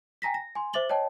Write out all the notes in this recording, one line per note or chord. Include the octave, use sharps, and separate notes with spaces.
G5 G#5 A#5 A#6 B6
A#6
G#5 C6
C5 E5 D6 A6 F#7 G7
C#5 D#5 G5 A5